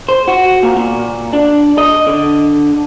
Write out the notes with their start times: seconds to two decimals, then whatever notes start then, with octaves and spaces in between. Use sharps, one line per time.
0.09 C5
0.28 F#4
0.63 A#2
0.76 A#2
1.33 D4
1.78 D#5
2.07 D3